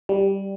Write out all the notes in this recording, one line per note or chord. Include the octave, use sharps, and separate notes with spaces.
G3